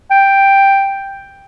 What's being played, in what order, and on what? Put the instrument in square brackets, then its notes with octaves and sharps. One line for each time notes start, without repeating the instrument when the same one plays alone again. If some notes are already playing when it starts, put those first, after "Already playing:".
[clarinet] G5